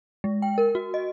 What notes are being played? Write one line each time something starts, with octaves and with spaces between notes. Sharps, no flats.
G#3
G5
A#4
F#4
D#5